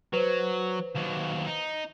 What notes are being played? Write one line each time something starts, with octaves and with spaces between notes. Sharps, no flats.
F#3 B4 C5
D#2 F#3
D#4